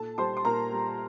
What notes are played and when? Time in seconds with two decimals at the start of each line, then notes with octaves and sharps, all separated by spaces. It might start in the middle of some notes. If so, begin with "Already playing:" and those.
Already playing: A#2 A4 A5
0.18 G3 C5 C6
0.37 C6
0.45 A#2 A#4 A#5
0.72 G3